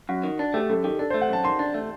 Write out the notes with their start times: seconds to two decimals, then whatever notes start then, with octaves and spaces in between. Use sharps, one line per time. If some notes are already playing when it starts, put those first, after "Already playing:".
0.09 F#2 F#4
0.24 D#3
0.39 D4
0.54 A3 G4
0.70 F#2 A4
0.84 D#3 G4
0.99 D4 A4
1.10 C5
1.14 A3
1.21 F#5
1.29 F#2 A5
1.44 D#3 C6
1.59 D4
1.74 A3